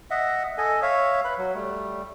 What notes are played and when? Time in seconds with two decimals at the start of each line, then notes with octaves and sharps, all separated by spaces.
0.10 D#5 E5 F#5
0.58 A4 D#5 G#5
0.82 C#5 E5 F5
1.24 B4 B5
1.38 F#3
1.55 G3 A3